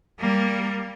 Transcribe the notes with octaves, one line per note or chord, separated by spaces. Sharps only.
G3 A#3